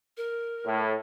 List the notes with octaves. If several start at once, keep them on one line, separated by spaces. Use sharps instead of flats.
A#4
A2